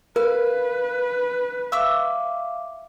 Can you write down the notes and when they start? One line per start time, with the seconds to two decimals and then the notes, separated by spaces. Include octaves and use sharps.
0.16 A#4 B4 F5
1.72 E5 F5 C#6 D6 E6